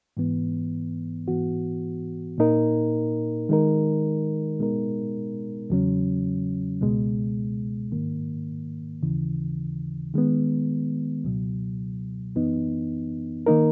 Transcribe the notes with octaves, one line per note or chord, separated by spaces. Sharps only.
G#2 E3 B3
G#2 E3 B3 F#4
A#2 A#3 D#4 A#4
D#3 G#3 D#4 A#4
B2 G#3 B3 D#4 A#4
E2 C#3 F#3 C#4
C#2 B2 G#3
G#2 D#3 A#3
D#2 C#3 E3
D#3 G#3 B3
C#2 B2 F#3
F#2 E3 B3 D#4
D#3 A#3 D#4 A#4